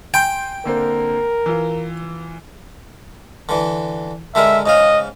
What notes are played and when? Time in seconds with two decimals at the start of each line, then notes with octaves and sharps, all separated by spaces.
0.14 G5 G#5 C6 G6
0.65 D3 A#3 C4 A#4
1.46 E3 F4
3.49 D3 E3
4.35 D3 G#3 A#4 E5
4.66 G#2 C#3 D#5 F5